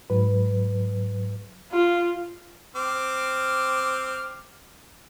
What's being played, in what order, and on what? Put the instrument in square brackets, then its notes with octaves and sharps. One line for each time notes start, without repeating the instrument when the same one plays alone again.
[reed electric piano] G#2 F#3 B4
[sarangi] F4
[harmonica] C4 D6 F6